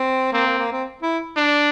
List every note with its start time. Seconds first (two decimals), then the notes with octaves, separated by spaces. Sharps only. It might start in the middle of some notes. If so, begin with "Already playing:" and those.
Already playing: C4
0.33 A#3 C4
0.46 A#3
0.59 A#3
0.72 C4
1.02 E4
1.36 D4